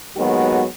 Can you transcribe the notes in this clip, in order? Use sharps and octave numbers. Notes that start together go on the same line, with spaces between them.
D#2 D#3 F#3 G#3 B3 F#4